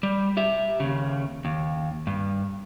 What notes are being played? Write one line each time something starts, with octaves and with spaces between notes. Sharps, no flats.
G3
G4 E5
D#2 C#3
D#2
G2